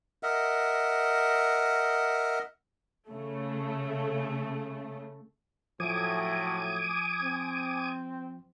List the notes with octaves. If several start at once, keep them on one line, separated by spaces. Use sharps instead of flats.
A#4 D#5 E5 F#5
C#3 A3
A2 F3 F#3 A3 G#5 D6 D#6
C4